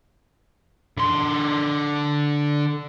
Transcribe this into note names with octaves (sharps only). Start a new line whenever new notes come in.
D3 C6